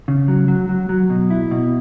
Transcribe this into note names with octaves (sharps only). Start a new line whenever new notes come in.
C#3
F#3
F#3
F#3
F#3
B2
E4
B2